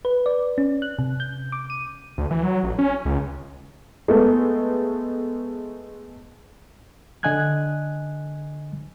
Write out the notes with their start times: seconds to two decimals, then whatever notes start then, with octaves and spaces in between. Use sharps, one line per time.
0.05 B4
0.26 D5
0.58 C#4
0.82 F#6
0.99 C3
1.20 G6
1.52 D6
1.70 D#7
2.18 D2
2.31 E3
2.43 F#3
2.63 A1
2.79 C#4
3.05 C#2
4.08 G#3 A3 B3
7.23 D3 D#5 G#5 F#6 G#6